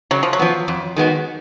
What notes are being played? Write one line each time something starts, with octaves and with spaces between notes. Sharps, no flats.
C#3 F#3
F3
F#3
F3 B3
F2
D#3 G#3 B3 F#4